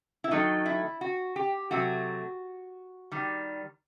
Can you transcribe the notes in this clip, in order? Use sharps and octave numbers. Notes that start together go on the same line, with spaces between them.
E4
D#3 F#3 A3 D#4
E4
F#4
G4
C3 F#3 A3 F#4
D#3 G3